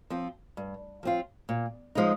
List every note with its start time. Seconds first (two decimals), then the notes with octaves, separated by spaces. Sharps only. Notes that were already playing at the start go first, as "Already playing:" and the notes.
0.10 F3 C4 F4
0.57 G2
1.03 F3 C4 F4
1.49 A#2
1.95 F3 G#3 D#4